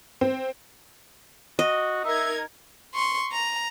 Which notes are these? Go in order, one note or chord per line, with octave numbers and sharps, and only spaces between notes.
C4
F#4 D#5
D#4 A#4 E5 G#6
C6 C#6
A#5